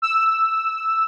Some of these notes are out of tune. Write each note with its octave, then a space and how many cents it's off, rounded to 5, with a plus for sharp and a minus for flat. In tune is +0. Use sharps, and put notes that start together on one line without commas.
E6 +0